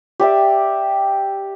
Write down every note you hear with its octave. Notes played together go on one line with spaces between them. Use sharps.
G4 D5 E5